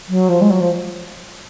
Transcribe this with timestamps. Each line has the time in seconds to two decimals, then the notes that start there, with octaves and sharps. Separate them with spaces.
0.09 F#3
0.28 F3
0.41 G#3
0.50 F#3
0.60 F3